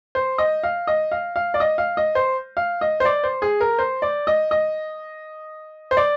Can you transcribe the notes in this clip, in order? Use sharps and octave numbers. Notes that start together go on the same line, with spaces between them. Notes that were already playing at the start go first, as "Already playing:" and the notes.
C5
D#5
F5
D#5
F5
F5
D5
D#5
F5
D#5
C5
F5
D#5
C5
D5
C5
G#4
A#4
C5
D5
D#5
D#5
C5
D5